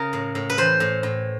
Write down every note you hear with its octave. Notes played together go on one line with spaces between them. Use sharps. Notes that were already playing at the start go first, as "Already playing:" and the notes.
Already playing: C#3 A#4
A2
A2
B4
E3 C5
A2
A2